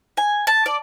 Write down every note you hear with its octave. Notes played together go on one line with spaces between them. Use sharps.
G#5
A5
D5